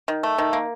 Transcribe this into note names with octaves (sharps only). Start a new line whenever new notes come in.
D#3
A3
D#3
A#3